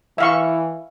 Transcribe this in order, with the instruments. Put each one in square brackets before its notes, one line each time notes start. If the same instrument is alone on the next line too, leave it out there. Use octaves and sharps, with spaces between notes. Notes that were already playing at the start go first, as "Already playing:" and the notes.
[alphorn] E3 [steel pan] E5 F5 C#6